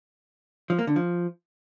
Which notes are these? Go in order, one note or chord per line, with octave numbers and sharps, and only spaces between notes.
F3
A#3
D3
F3